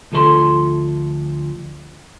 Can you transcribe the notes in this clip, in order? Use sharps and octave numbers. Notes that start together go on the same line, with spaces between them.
D2 F3 A4 B4 C6